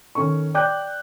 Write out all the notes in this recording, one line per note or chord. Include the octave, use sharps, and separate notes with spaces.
D#3 C#4 A4 C#6
D5 G5 D6 F#6 G6